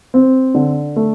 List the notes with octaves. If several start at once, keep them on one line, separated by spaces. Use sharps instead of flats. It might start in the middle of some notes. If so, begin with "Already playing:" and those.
C4
D3
A3